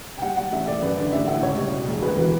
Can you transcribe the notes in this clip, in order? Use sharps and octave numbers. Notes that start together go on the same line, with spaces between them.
G5
G3 F#5
G3 F#5
A1 E5
A3 D5
F#2 B4
D3 D5
A1 E5
A2 F#5
C#2 C#5
G3
B2
E1
D2 B4
E3 B4